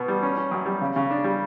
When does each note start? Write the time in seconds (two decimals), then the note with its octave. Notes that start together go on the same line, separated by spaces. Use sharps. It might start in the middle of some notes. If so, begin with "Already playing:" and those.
Already playing: B2
0.08 G3
0.23 C#4
0.37 C#4
0.51 F#2
0.66 G3
0.81 C#3
0.96 C#3
1.10 D4
1.24 G3